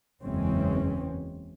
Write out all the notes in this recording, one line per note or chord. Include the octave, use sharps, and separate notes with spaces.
F#1 E2 E3 G#3 C4 C#4